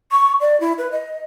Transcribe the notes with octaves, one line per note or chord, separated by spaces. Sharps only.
C#6
D5
E4
B4
D#5